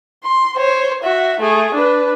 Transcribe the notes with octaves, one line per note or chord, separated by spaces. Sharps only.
C6
C5 C#5
F#4 E5
A3 G#4
D4 B4